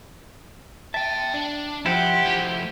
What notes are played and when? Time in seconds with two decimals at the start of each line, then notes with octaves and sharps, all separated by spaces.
0.94 E5 G5 A5
1.34 D4
1.86 F3 E4 G4 C5 F#5
2.26 F3 A3